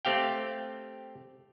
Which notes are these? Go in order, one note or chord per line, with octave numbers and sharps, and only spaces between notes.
A3 C4 G4 F5 G5